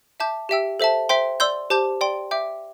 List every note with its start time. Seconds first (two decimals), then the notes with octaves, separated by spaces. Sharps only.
0.20 E5 A5 D6 G6
0.49 G4 E5 G5 E6
0.80 A4 C5 E5 A5
1.09 C5 E5 G5 C6
1.40 D5 C6 E6 G6
1.70 G4 C5 A5 D6 G6
2.01 D5 G5 C6
2.31 E5 G5 D6 G6